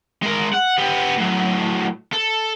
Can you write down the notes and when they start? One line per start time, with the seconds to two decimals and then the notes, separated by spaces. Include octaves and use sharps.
0.22 G#3 A#4
0.53 F#5
0.78 B3 G4
1.18 A2 F#3
2.13 A4